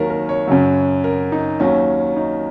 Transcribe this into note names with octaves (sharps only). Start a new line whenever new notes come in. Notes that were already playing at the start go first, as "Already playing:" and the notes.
Already playing: D#2 D#3 F#3 A#4
A#4
C#5
F#2 C#3 F#3
A#4
D#4
D#2 D#3 F#3 C#4
D#4